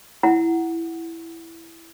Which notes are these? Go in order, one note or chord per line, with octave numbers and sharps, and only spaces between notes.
E4 F#5 A#5